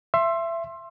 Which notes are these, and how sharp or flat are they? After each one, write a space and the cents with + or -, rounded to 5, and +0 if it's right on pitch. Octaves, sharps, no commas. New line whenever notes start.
E5 +25 C6 +20